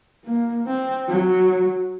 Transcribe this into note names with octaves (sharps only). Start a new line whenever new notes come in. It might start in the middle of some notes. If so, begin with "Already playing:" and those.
A#3
C4
F#3